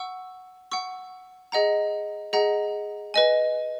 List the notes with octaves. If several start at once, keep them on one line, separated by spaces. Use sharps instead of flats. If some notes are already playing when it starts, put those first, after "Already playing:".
Already playing: F#5 C#6 E6
F#5 C#6 E6
G#4 D#5 F#5 A#5
G#4 D#5 F#5 A#5
B4 D#5 G#5